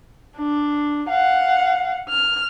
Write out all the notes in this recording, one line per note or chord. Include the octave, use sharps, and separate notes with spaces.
D4
F5 F#5
F6